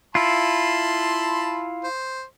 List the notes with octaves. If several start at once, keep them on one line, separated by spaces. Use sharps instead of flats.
E4 F4 A5 B5 C6
C5